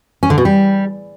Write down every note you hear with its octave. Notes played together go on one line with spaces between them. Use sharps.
C#4
D3
B2
G3